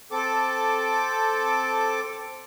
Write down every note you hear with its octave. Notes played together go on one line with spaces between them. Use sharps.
C4 A4 D6